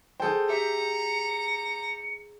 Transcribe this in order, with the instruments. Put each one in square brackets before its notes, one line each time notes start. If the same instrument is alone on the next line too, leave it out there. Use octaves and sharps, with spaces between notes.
[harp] G#4 G5 [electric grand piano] A4 C5
[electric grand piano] G4 E5 [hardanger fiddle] A#5 [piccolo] C#7